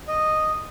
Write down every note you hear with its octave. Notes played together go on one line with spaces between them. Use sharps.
D#5